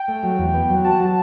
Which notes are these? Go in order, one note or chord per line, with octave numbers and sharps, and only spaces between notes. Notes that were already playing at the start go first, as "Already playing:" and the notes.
Already playing: G5
A3
F#3
E2
B3
F#3
F#4 A5
F#3